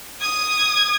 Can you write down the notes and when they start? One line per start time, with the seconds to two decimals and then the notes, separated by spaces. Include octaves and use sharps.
0.21 D#6 G#6